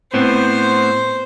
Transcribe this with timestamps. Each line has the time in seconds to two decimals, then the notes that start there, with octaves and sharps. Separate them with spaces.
0.14 A2 B3 C4 C5